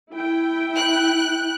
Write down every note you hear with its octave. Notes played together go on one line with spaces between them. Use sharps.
E4 G5
F#6